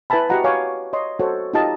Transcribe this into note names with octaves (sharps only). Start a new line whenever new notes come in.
E4 B4 E5 G#5 A5 B5
F#4 G4 D#5 F#5 A#5
C#5 F5 G#5 D6
C#5 D#5 C6
F#4 A4 C5 C#5 F#5
D#4 F4 G4 D#5 A5